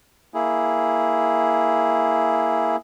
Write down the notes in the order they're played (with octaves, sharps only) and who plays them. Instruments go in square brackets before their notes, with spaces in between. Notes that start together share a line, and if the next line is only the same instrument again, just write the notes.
[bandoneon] A#3 E4 G#4